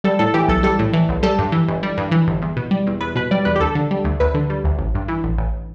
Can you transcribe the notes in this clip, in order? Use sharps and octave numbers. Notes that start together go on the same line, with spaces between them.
G3 A4
A2 A4
E3 G4
B1 A4
G3 A4
A2
E3
B1
G3 A4
G2
E3
G1
G3
G2
E3
G1
E2
B2
G3
E2
E2 B4
B2 B4
G3 D5
E2 B4
G4
D2 A4
D3
G3
D2
D2 B4
D3
G3
D2
A1
G2
E3
A1
A1